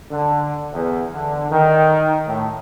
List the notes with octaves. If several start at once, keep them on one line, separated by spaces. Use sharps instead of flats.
D3
E2
D3
D#3
A2